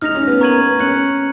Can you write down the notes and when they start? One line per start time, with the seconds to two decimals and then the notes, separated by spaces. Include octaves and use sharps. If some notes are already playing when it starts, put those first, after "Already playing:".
0.02 D#4 F6 A#6 F7
0.15 C#4
0.27 B3
0.41 A#3 A#5 C#6 G#6 D#7 F#7
0.61 B3
0.80 C#4 F#6 C#7 F#7